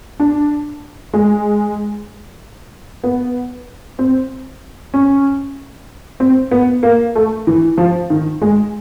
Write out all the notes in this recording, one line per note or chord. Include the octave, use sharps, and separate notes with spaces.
D4
G#3
B3
C4
C#4
C4
B3
A#3
A3
E3
F3
D#3
G#3